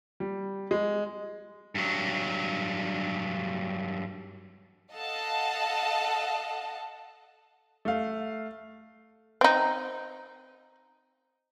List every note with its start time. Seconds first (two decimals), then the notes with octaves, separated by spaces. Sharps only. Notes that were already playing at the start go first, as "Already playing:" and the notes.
0.20 G3
0.71 G#3
1.75 G2 F#3
4.92 A4 D#5 F5 F#5 A5
7.85 A3 F5
9.41 C4 D#4